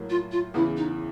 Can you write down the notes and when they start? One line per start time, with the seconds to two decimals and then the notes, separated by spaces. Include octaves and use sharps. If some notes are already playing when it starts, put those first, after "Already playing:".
Already playing: A2 F#3 A#3
0.09 F4
0.31 F4
0.54 E2 C#3 E3 E4
0.76 D#4